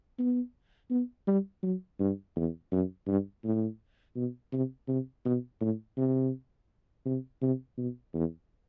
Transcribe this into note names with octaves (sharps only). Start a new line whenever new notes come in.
B3
B3
G3
F#3
G2
E2
F#2
G2
A2
B2
C3
C3
B2
A2
C3
C3
C3
B2
E2